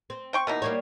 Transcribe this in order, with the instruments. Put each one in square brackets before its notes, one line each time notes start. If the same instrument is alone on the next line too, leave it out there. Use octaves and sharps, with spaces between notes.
[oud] C4
[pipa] C5 G5 C#6
[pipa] B2 E3 D#4 [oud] A#3
[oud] G3 A#3 C#5